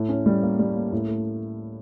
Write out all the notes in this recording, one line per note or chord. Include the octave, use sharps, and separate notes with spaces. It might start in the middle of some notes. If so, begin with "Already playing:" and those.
Already playing: A2
C#4
G3
A#3
G3
A#3
A2
A3